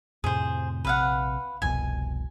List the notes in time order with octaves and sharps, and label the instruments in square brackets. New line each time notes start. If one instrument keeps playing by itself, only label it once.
[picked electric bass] F2 A2 C3 [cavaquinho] G#4 C5
[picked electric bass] A#1 C3 [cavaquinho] B4 F5 F#5
[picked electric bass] F1 C2 B2 [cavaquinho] G#5